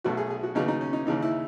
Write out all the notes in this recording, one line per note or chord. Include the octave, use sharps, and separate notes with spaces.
B1 B2 A3 F#4
G#4
G#4
F#4
D#2 C#3 F#3 B3 D#4
D#4
C#4
D#4
D#2 C#3 E3 D#4
E4